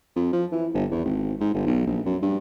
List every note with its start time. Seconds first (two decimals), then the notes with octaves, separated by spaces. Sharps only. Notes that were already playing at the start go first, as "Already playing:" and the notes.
0.16 F2
0.33 F3
0.52 E3
0.74 G1
0.92 E2
1.05 G#1
1.40 G#2
1.54 G1
1.66 B1
1.87 A#1
2.06 F#2
2.22 G2